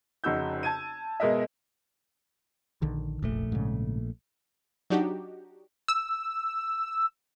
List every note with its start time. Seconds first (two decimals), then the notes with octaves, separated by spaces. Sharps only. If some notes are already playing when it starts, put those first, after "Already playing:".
0.24 F1 C#3 D#4 F#4 E6 G6
0.63 A5 G#6 D#7
1.20 B2 G#3 A#4 D#5 E5
2.82 A#1 D3 D#3
3.23 F1 A#1 A#2 A3
3.52 G#2 C#3
4.90 F#3 D4 D#4 F#4 G4
5.88 E6